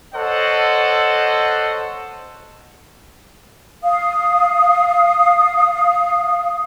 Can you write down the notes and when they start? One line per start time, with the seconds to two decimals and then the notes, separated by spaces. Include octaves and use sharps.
0.14 A4 C5 C#5 D#5 F#5
3.84 F5 D#6